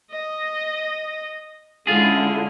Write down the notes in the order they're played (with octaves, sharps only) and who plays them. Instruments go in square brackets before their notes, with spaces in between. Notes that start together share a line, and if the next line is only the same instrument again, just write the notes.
[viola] D#5
[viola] D3 [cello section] G#3 C#4 E4 [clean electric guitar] F4 G#4